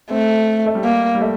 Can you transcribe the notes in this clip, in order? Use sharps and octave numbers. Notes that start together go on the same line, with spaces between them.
A3 C4
A3
G3
A#3
G3
A3